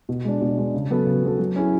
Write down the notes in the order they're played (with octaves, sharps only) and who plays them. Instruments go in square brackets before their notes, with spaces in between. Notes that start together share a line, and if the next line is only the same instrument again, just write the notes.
[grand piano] B2
G#3 D4
B2
G#3 D4
C#3
F#3 B3 F#4 A4
C#3
F#3 B3 F#4 A4
F#3
C#4 E4 G#4